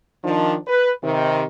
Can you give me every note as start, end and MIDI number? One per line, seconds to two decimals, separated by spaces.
0.24 0.56 51
0.24 0.56 53
0.24 0.56 62
0.67 0.91 71
1.04 1.43 48
1.04 1.43 51